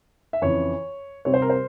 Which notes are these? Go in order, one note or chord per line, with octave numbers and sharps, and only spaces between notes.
E5
F2 C#3 E3 C#5
C3 G3 C4 C#5
C5
A#4
C5